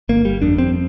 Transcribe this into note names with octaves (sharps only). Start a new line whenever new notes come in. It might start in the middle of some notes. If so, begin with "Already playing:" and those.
G1 A#3
G3
F2 D4
C4